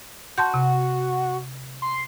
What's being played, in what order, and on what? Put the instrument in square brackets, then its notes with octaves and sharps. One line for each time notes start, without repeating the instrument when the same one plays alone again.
[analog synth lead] F#4 [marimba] A5 C6 G6
[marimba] C3
[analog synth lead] C6